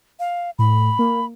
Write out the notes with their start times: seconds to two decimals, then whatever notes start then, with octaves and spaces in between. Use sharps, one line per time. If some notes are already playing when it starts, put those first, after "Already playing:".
0.20 F5
0.59 A2 B5
0.99 A#3